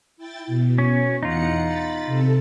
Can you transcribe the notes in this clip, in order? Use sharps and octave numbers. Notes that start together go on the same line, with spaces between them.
E4 G5 A6
B2
C#4
E2 D#4 F4 F#5 C#7
B5 A6
C3 A4